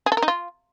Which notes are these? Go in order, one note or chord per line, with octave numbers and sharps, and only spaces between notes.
G#4
A4
A#4
D#4
F4